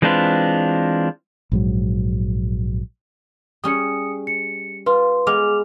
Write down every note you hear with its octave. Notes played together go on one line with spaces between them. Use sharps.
E3 G#3 C4 D4 F4 B4
A#1 G#2 F#3
G3 C#4 G#4 D#6 C#7
C#7
F4 B4 C6
G#3 B3 D6 F6 F7